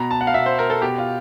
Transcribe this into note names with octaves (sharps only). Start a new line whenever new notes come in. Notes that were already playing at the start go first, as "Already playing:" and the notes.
Already playing: B2 A#5
A5
F#5
F5
B2 E5
C5
A#4
A4
B2 G4
F4